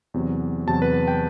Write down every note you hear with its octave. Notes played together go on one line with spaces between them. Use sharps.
E2 C3 F#3
E2 C3 F#3 A5
B4
G5